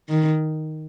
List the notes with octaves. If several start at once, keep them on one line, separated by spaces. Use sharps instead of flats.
D#3